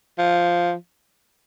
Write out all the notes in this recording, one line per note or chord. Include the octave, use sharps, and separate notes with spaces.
F3